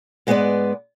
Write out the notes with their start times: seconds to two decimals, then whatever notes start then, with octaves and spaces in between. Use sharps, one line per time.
0.27 G#2 G#3 B3 G4 B4 D5